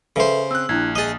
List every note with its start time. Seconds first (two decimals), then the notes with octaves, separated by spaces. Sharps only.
0.16 C#3 A4 B4 C5 E5
0.51 C4 E6 F#6
0.69 A#1 D4 E4 G#6
0.95 G#4 D#5 D#6 A6